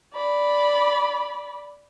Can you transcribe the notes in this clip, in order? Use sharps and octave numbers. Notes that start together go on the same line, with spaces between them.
D5 B5